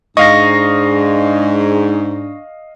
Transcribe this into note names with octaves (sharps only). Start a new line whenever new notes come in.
G#2 D4 D#5 F5 C#6 A#6